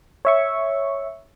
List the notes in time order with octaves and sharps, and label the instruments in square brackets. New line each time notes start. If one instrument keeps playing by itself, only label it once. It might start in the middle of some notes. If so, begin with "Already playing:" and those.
[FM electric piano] C#5 E5 C#6